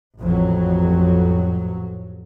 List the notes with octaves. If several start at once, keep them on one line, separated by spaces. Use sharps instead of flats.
A1 F2 F#3